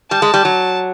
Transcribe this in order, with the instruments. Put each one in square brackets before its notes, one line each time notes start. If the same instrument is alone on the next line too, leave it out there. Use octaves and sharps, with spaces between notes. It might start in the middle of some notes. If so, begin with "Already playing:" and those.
[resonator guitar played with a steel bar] G3 [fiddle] A5
[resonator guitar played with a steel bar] G#3
G3
F#3